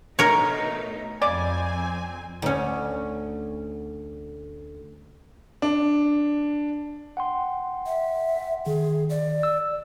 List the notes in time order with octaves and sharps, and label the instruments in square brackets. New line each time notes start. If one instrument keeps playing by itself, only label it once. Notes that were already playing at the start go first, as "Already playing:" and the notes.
[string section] B2 A3 D#4 [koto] A#4 C#5
[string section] F2 C4 G#5 [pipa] C#3 G#3 D5
[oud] D2 C#4
[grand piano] D4
[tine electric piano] F#5 G5 C6
[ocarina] E5
[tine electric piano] D#3 [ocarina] G#4
[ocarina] D5
[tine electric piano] E6